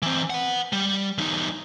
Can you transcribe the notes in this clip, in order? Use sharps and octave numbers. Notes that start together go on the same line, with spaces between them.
E3 C4
B4 F#5
G3
E2 D#4